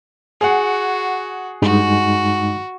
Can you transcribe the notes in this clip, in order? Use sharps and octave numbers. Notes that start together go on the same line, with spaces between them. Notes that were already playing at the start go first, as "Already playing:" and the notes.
F#4 G#4 F#5
G2 G#3 D#4 F#4